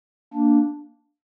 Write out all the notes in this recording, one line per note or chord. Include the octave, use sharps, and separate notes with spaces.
A#3 D4